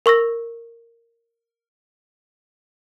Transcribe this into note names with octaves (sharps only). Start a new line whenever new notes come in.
A#4 C#6 E6 A#6